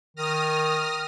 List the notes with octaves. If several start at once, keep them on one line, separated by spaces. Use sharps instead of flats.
D#3 D#6 F6 A#6